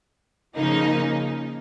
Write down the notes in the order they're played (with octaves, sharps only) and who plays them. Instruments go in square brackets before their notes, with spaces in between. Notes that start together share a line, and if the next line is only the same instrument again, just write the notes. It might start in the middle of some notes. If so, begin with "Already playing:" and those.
[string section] C#3 F3 A#3 D#4